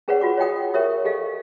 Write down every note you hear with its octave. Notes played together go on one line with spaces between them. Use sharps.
C#4 G#4 B4 C#5 D5 F#5
F4 F#4 D6
C#5 D#5 F#5 G5 D#6
G4 A#4 C#5 E5 D#6
G4 A4 D#5 F5